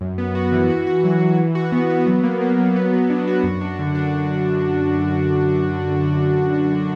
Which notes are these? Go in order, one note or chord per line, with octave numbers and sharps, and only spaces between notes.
F#2
B3
F#4
E3
F#4
F#4
F#3
F#3
E3
F#4
B3
B3
F#3
A#3
A#3
F#3
B3
F#3
D4
F#4
F#2
D4
D3
D4